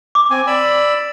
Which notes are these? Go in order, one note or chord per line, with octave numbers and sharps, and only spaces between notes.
D6
C4 G#5
D5 B5 E6